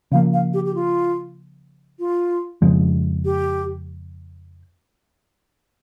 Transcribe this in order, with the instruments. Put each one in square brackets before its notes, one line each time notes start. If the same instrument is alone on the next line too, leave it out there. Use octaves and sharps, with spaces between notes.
[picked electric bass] C#3 F3 A#3 [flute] F5
[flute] F5
G4
G4
F4
F4
[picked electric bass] F2 C#3 F3 G#3
[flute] G4